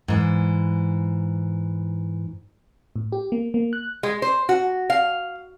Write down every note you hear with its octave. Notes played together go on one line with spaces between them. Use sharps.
G#2 E3
A2
G4
A#3
A#3
F#6
G#3
C5
F#4
F5